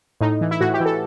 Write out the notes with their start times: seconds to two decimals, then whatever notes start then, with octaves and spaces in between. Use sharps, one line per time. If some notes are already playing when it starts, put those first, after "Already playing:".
0.21 A2 D#4
0.41 E3
0.51 E4
0.61 A2 F#4
0.74 G4
0.80 E3
0.86 A4